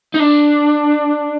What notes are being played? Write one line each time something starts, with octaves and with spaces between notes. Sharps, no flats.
D#4
D4